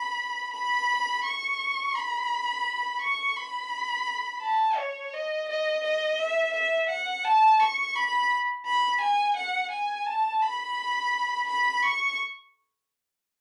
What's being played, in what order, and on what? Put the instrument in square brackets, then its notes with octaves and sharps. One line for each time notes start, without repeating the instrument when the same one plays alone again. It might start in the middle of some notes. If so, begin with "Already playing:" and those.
Already playing: [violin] B5
B5
C#6
B5
C#6
B5
A5
C#5
D#5
D#5
D#5
E5
E5
F#5
A5
C#6
B5
B5
G#5
F#5
G#5
A5
B5
B5
C#6